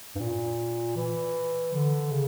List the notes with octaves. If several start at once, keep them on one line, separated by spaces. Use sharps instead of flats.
G2
A#2
E3
D3
C#3